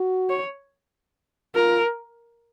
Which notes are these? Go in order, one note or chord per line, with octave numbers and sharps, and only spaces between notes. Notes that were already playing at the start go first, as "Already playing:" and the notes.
Already playing: F#4
C#5
F4 A#4